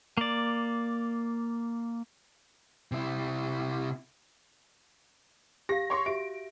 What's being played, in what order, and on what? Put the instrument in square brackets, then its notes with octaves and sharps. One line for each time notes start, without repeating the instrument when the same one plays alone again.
[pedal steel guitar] A#3 D5
[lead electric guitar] C3 E4
[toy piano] G4 F5 [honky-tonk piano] A#6
[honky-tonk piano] C#5 C6 C#6
[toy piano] F#4 G4 E5 [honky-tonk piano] D7